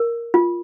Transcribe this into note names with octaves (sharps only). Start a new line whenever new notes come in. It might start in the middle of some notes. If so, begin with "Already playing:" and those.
Already playing: A#4
F4